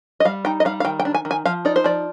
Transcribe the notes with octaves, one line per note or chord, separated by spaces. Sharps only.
D#5
G3 F5
D#4 G5
D#5
G3 F5
F5
D#3 G5
G5
D4
G#5
D#3
G#5
F3 F5
D#4 D5
C5
F3 D5